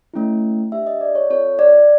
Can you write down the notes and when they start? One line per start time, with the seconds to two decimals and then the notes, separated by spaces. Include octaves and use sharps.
0.14 A3 C#4 E4
0.72 D4 G4 E5
0.87 D#5
1.01 D5
1.15 C#5
1.30 C4 F4 A4 C#5
1.59 D5